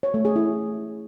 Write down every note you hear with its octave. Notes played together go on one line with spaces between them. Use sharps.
C#5
A3
G#4
E4